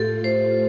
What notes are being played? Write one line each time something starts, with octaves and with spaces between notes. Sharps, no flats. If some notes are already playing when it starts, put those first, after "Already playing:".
Already playing: A2 A3 F4 G4 A4
C5